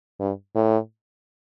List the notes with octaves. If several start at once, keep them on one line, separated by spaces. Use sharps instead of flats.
G2
A2